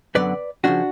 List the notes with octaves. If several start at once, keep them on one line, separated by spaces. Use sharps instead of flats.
F#2 D3 F#3 B3 B4 D5
C#3 F3 A3 C#4 D4 F#4